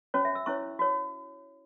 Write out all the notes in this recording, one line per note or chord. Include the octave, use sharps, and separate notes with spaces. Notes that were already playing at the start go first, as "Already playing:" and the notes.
C#4 F#4 C#5
E5
E6
C#4 E4 C#5 C#6
F#4 C#5